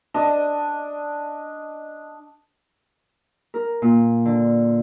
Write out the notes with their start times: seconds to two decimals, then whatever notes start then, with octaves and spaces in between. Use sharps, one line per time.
0.14 D4 D#5
3.54 A#4
3.82 A#2
4.25 D3